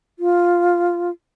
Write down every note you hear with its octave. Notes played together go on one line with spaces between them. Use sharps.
F4